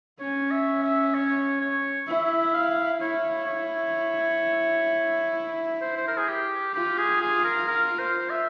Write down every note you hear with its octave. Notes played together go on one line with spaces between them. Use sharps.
C#4 C#5
E5
E5
C#5
C#5
E4 E5
F5
E4 C#5
C#5
C5
C5
A#4
G#4
G4
F4 G4
G#4
G#4
A#4
A#4
C5
E5